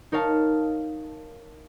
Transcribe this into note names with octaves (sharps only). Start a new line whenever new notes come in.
D#4 A#4 C#5 F5 A5